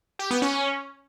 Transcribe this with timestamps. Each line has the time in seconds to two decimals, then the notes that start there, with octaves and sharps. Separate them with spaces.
0.19 G4
0.31 B3
0.42 C#4